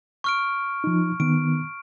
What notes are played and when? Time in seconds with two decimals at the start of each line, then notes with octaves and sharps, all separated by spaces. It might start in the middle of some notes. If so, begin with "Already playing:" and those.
0.24 C#6 F6 D7
0.84 F3 D#4
1.20 D#3 B3 D7